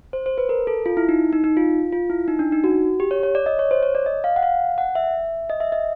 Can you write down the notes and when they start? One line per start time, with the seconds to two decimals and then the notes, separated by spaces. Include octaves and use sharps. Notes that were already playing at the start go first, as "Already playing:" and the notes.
0.13 C5
0.26 C5
0.38 B4
0.49 A#4
0.67 A4
0.86 F4
0.97 E4
1.09 D#4
1.33 D#4
1.44 D#4
1.57 F4
1.92 F4
2.10 E4
2.28 D#4
2.39 D4
2.52 D#4
2.64 F#4
3.00 G4
3.11 C#5
3.23 C#5
3.35 D5
3.46 D#5
3.59 C#5
3.71 C5
3.83 C#5
3.95 D5
4.06 D#5
4.24 F5
4.36 F#5
4.43 F5
4.78 F#5
4.95 E5
5.50 D#5
5.60 E5
5.72 D#5